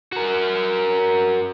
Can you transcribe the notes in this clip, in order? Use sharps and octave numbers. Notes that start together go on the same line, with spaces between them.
F#4 A#4